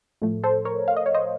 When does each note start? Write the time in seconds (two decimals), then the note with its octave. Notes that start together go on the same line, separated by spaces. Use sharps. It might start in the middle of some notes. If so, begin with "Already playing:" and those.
0.22 A2 F3 A3
0.43 A4 C5
0.65 A#4 C#5
0.88 F5
0.97 D#5
1.06 C#5
1.14 C5 D#5